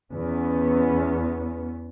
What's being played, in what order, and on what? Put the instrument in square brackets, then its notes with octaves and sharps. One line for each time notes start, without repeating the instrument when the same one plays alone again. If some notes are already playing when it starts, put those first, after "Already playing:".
[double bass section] E2 B3 C#4